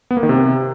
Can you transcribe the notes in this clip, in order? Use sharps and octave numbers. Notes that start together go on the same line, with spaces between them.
B3
A#3
D#3
C3